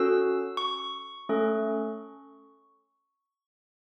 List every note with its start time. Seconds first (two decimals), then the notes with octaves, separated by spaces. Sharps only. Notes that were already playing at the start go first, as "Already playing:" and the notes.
Already playing: C#4 F#4 A4 E6
0.57 C#6
1.29 A3 C#4 A4